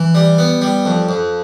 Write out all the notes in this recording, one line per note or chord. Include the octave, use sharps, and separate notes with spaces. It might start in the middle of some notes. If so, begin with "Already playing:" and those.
Already playing: E3
G3
B3
G3
F2
F2